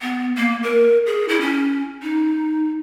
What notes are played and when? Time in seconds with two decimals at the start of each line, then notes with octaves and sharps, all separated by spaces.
0.02 B3
0.37 A#3
0.63 A#4
1.06 G#4
1.28 E4
1.41 C#4
2.03 D#4